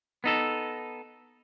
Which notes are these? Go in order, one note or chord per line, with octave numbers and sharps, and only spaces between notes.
B3 D#4 A4